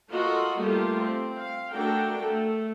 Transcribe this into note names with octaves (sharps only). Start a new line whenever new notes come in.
F4 F#4 A4 A#4 D#5
G3 A3 A#3 F4 G4
C4
F5
A3 D4 F#4 A4 A#4 G5
A3 A4